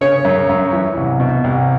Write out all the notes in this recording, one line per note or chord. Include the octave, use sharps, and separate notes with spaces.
C#3 C#5
F#2
F#2
E3
C2
B2
C2